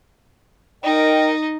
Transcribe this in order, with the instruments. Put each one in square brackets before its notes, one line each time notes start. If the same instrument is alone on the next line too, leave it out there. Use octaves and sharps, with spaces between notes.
[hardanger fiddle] D#4 [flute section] A#4 D#5 G5